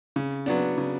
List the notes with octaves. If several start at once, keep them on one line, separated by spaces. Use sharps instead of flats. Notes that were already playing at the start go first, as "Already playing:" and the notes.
C#3
F#3 B3 D4
C#3